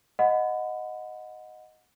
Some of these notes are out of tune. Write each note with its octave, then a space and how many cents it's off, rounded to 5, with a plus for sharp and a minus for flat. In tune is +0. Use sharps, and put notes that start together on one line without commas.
D#5 +0 F#5 -15 B5 +30